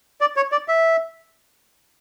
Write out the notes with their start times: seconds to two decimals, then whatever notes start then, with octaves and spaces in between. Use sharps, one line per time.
0.21 D5
0.36 C#5
0.52 D5
0.68 E5